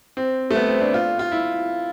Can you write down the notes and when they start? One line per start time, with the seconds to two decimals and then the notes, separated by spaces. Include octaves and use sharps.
0.17 C4
0.51 A3
0.56 B3
0.68 C4
0.80 D4
0.94 F4
1.19 F4
1.32 E4